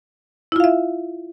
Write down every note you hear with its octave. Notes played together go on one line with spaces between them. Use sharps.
E4 F4 E5 F5